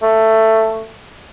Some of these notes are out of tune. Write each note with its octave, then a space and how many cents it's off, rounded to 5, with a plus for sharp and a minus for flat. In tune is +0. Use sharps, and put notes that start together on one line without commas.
A3 +10